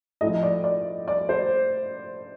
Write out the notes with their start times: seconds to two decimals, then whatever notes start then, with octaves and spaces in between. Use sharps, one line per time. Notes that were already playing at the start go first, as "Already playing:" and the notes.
0.21 A2 F3 D#5
0.43 D5
0.64 D5
1.08 D5
1.29 C5